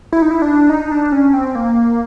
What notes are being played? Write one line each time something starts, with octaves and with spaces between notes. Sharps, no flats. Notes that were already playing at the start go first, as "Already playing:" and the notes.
E4
D#4
E4
D4
D#4
D4
C#4
C4
A#3